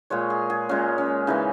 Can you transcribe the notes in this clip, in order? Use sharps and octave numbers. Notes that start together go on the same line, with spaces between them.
A#2 G#3 C#5
G#4
G#4
A#2 G#3 C#4
C#4
C#3 E3 G#3 D#4